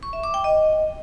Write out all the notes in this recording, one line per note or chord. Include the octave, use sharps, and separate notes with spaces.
C#6
E5
D6
G5
D#5